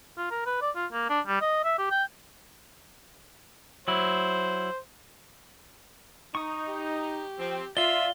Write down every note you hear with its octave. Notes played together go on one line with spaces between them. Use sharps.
F4
A#4
B4
D5
F4
A#3
D4
G3
D#5
E5
G4
G5
F#3 E4 C5
D#4 C#6 D#6
G4
F3 C4
F4 D5 E5 F5 G7